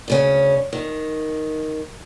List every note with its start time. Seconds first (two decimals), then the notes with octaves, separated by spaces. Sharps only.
0.08 D2 C#3 C#4
0.73 D#3